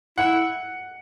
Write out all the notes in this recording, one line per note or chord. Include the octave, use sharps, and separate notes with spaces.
E4 F#5